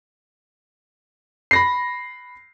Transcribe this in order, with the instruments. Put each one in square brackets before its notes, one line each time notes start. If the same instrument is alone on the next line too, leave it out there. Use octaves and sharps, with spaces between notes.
[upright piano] B5 A#6 C7